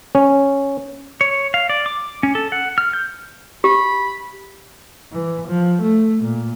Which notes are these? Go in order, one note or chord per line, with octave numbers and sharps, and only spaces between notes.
C#4
C#5
F5
D5
D6
C#4
A4
F#5
F6
G6
G4 B5
E3
F3
A3
A#2